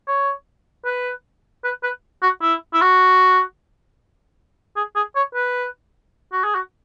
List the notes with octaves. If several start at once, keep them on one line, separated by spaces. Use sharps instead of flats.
C#5
B4
B4
B4
F#4
E4
E4
F#4
G#4
G#4
C#5
B4
F#4
G#4
F#4